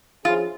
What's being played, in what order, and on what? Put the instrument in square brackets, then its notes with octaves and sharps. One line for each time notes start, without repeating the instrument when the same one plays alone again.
[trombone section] F3 C#4 G#4 [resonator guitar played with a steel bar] F4